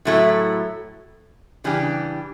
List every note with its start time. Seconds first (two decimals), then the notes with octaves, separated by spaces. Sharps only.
0.05 A2 F#3 A3 E4 A4
1.64 C#3 E3 G3 D4 G4